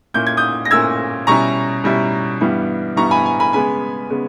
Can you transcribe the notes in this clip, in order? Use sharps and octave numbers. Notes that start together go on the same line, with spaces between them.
A#2 A#3 C#4 E4 G6
G#6
D#6 G6
A#6
A#2 A#3 C#4 E4 E6 G#6
B2 G3 C#4 E4 A#5 C#6
B2 G3 C#4 E4
G2 E3 G3 B3
G2 E3 G3 B3 A#5 C#6
G#5 B5
G#5
G#5 B5
C#3 G#3 B3 G#5 B5
C#3 G#3 B3